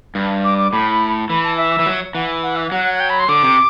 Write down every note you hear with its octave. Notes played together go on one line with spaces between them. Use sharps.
G2
D6
D6
A2 B5
E3 B5
A5
E5
E3
F#3
E3 F#5
F#5
E5
F#3 F#5
F#5
G5
B5
C6
D3 D6
C3